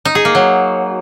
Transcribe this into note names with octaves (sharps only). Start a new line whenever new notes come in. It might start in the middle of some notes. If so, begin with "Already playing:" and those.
D#4
G#4
A#3
F#3